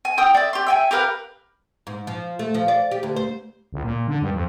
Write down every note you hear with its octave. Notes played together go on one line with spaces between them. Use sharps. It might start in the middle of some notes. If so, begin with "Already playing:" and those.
G#5
G4 G5 D#6 E6
D5 E5
G4 C6
E5 G5 G#5
G4 A#4 B4 F5
G#2
F3
A3
F3
D5
G4
D2
C5
C#2
A#2
D3
G2
F2